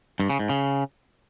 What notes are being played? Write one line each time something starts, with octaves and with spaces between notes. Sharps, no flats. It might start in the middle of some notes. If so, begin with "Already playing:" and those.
G2
C#3
G#2
C#3